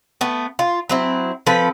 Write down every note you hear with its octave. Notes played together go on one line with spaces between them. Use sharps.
A3 B3
F4
F#3 C4 E4
F3 C4 A4 B4